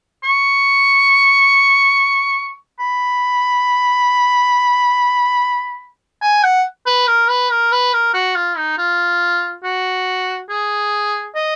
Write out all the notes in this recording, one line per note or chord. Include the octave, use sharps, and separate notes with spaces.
C#6
B5
G#5
F#5
B4
A#4
B4
A#4
B4
A#4
F#4
F4
D#4
F4
F#4
G#4
D#5